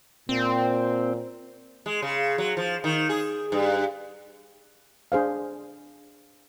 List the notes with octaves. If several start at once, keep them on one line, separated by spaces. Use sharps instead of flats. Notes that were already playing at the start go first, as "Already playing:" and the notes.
A#2 C4
G#3
C#3
F#3
F3
D#3
G#4
G2
D4 G#4 C5 F5